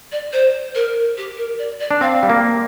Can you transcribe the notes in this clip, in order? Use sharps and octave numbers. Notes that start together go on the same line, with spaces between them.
D5
C5
A#4
G4
A#4
D5
D5
D4
C4 F5
G3
A#3